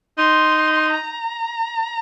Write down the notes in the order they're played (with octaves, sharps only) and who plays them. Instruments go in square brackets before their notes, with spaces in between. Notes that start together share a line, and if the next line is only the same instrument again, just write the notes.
[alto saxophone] D#4 [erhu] C6
[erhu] A#5